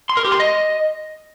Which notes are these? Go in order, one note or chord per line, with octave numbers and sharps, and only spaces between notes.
C6
A#4
G4
C6
D#5